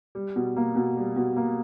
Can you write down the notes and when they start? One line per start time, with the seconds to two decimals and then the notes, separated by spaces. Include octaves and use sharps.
0.15 G3
0.36 B2
0.56 A#3
0.76 B2
0.97 G3
1.16 B2
1.36 A#3